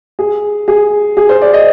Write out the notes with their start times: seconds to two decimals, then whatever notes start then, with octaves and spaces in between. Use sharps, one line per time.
0.19 G#4
0.68 G#4
1.17 G#4
1.29 C5
1.42 D5
1.53 D#5